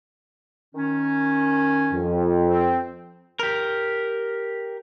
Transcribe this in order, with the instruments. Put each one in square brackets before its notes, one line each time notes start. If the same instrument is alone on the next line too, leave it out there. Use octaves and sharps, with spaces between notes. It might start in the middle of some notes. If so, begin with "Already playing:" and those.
[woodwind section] D#3 C#4
[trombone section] F2
[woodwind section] C4
[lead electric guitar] G4 A#4